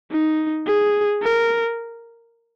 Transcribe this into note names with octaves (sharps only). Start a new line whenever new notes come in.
D#4
G#4
A#4